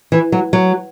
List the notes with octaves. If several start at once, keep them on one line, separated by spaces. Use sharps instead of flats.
E3
F#3
F#3